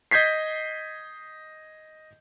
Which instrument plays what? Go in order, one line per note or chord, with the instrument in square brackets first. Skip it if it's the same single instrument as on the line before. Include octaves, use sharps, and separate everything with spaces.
[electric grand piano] D#5 G6 G#6 B6 C7